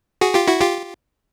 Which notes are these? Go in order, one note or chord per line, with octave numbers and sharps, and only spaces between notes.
F#4 G#4
F4 G4
E4 F#4
F4 G4